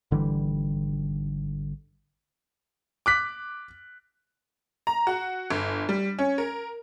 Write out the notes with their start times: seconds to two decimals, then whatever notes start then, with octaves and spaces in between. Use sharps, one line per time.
0.11 G#1 D3 E3 G3
3.06 D6 F#6 B6
4.87 A#5
5.07 F#4
5.50 G1
5.89 G3
6.19 C#4
6.38 A#4